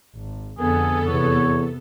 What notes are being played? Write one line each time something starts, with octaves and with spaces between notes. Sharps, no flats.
G#1
F2 D3 B3 G#4 A4
E2 C3 C#5